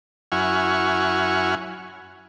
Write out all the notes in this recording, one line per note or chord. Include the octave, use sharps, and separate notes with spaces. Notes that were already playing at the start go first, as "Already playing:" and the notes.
F#2 E4 F#5 G#5 C#6 F6